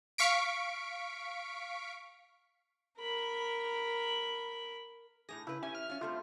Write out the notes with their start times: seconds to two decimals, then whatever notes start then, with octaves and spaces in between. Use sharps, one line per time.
0.18 F5 C#6 B6 D7
2.99 A#4 B5
5.29 A2 A#3 G#4 A#6
5.47 C#3 E4 B4
5.63 C#4 E4 G4 G#5
5.75 F6
5.90 C#4 F4
6.01 G3 A3 C4 F4